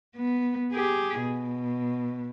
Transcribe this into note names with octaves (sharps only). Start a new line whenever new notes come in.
B3
G4 G#4
B2